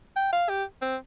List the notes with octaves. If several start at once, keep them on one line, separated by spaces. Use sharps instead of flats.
G5
F5
G4
C4